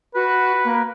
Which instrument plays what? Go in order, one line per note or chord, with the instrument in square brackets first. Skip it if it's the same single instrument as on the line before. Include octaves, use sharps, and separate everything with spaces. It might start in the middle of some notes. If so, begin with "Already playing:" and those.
[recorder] F#4 [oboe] B4
[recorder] A#3